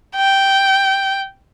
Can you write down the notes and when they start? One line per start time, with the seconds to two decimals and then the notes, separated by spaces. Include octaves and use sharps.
0.16 G5